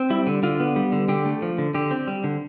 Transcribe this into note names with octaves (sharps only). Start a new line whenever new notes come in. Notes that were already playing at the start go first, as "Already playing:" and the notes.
Already playing: C4
G3 E4
D3
D3 F4
B3
G3
D3
D3 G4
A3
F3
D3
D3 G4
C4
G3
D3